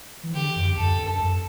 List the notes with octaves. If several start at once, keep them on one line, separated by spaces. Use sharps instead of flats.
E3
D3 G4
F#2
E2
F#2 A4
G2
G2
F#2